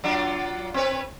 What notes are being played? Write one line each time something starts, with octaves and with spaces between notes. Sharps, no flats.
F#3 D4 F4
C4 B4 C#5